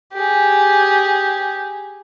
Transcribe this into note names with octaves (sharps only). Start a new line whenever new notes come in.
G4 G#4